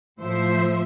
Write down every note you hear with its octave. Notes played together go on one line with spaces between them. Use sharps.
A2 F3 C5 E5